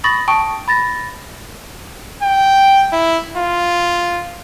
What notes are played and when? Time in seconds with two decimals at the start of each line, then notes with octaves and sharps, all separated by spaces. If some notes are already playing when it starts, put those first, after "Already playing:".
0.04 B5 C#6 D#6 A6 A#6 F#7
0.28 G5 A5 C#6 D#6 D7
0.68 B5 A6 A#6
2.23 G5
2.92 E4
3.37 F4